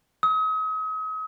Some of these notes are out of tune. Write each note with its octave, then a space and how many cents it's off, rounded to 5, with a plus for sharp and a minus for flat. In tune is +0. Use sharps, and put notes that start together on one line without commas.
D#6 +40